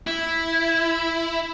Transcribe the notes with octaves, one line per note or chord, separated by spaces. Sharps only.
E4